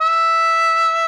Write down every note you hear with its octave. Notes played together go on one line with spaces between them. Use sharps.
E5